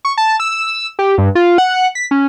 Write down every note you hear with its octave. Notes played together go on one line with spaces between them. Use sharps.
C#6
A5
E6
G4
G2
F4
F#5
B6
C#4